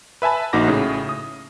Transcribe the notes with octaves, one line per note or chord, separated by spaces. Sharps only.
B4 E5 G#5 A5 B5
A#1 A#3 D#4 F#4 D6 A#6
A2 C#3
D#6